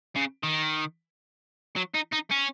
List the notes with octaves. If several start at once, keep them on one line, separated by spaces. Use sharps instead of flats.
C#3
D#3
F#3
D#4
D#4
C#4